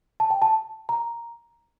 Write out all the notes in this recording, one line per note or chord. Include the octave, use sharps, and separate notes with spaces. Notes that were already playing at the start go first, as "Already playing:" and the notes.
A5
G5
A5
A#5